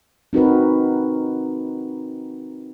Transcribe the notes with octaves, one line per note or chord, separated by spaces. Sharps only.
C4 D#4 F#4 A#4 B4